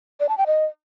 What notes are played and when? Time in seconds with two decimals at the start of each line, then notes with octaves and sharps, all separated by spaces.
0.20 D5
0.29 A5
0.38 G5
0.47 D#5